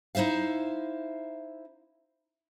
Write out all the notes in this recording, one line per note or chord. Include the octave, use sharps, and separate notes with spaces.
D#4 E4 C5 E5 F5